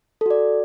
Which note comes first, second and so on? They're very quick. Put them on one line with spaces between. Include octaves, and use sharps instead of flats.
A4 F#4 D5